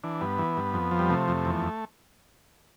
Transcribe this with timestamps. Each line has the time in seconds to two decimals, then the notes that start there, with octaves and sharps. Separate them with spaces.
0.04 E3 D4
0.21 G2 B3
0.38 E3
0.57 G2
0.74 F2
0.91 F3
0.99 G3
1.09 C3 A3
1.28 F2
1.45 E2